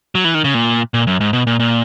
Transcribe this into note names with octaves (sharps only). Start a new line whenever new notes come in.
F#3
E3
D#3
C#3
A#2
A#2
F#2
G#2
B2
A#2
A#2